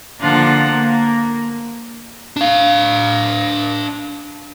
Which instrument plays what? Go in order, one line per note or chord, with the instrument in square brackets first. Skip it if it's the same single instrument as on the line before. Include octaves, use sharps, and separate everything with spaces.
[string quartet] D3 F3 A#3 D4 F4 F#5
A#3
[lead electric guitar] D4 F5